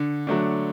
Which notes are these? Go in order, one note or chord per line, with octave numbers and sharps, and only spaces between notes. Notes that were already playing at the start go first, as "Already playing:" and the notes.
Already playing: D3
F#3 A3 D4